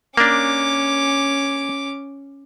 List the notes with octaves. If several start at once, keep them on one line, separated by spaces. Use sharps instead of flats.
A#3 C#4 D4 D6